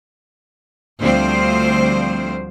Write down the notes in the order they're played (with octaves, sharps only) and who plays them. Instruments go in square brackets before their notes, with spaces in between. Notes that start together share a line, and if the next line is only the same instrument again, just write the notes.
[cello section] D2 F3 G3 C4 C5